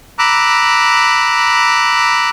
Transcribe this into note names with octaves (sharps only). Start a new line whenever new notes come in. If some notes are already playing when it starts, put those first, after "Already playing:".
A#5 B5 D6 E6 F#6